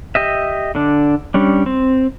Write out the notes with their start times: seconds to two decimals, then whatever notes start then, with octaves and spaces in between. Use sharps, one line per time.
0.15 G4 D#5 E5
0.75 D3 D4
1.34 G3 C#4 D4
1.66 C4